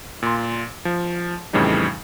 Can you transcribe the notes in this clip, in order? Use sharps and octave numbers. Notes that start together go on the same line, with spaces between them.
A#2 C6
F3
F2 A2 C#3 E3 G3 D#4